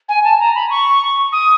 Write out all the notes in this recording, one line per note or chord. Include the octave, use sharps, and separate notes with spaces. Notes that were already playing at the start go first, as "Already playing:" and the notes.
G#5
A5
A#5
B5
C#6
D#6